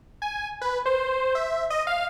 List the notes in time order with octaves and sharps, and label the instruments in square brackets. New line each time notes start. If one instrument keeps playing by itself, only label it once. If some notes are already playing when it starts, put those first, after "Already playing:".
[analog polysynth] G#5
B4
C5
E5
D#5
F5